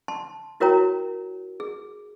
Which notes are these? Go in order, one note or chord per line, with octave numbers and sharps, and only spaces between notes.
A5 C6
E4 F#4 A#4 C#5 G5 A#5
G#4